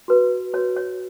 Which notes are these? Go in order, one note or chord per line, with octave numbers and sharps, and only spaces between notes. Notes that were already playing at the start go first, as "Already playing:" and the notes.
F#4 B4
F#4 B4 C#5
C#5